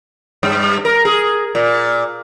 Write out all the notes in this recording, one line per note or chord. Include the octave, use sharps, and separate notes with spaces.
G2
A#4
G#4
A#2